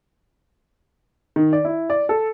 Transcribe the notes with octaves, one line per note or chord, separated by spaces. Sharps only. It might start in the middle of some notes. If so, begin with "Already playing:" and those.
D#3
D5
E4
D5
A4